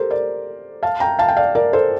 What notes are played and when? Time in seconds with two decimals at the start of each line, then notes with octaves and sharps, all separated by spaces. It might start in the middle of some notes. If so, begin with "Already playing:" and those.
Already playing: G4 A4 A#4 C5
0.10 A#4 D5
0.83 F5 A5
1.00 G5 A#5
1.19 F5 A5
1.28 G5
1.37 D5 F5
1.55 A#4 D5
1.73 A4 C5